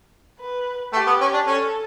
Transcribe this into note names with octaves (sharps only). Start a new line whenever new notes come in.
B4
A3 G4
B3
C#4
D4
C#4 A4